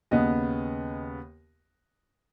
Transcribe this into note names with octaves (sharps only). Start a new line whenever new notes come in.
D#2 C#3 B3 D#5